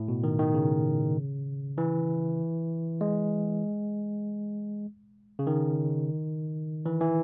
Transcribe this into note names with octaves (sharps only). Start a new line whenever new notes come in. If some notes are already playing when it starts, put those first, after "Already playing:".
Already playing: A2
B2
D#3
D#3
C#3
E3
G#3
C#3
D#3
E3
E3